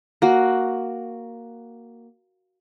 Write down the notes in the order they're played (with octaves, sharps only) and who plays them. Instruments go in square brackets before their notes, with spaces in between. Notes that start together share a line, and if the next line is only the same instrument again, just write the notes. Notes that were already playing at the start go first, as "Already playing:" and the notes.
[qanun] A#3 F#4